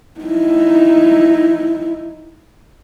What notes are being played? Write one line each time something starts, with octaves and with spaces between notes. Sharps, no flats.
D#4 E4